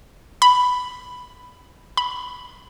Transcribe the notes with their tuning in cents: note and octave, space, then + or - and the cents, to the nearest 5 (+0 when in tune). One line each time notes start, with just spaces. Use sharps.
B5 +10
B5 +5